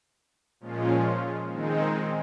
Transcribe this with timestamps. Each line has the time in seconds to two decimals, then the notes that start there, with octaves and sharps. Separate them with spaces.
0.60 A#2 F3 G#3 C#4 F4
1.50 D#3 G#3 C4 D#4